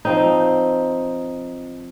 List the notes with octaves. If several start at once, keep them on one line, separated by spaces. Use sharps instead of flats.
F3 C4 D#4